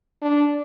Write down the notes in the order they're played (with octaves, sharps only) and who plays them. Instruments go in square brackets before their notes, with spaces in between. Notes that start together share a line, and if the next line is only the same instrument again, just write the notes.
[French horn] D4